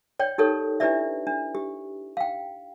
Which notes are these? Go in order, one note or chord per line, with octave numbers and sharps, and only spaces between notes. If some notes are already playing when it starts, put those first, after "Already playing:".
C#5 D5 G5
D#4 G4 A4 A#4 C#5
D4 E4 G4 B4 D5 E5
D4
G4
F5 G5